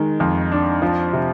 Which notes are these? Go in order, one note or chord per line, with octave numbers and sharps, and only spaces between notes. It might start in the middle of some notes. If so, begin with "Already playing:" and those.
Already playing: D#3 G#3
F2
D4
F3
C3